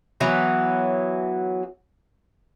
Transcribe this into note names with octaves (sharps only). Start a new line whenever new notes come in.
E3 F#3 B3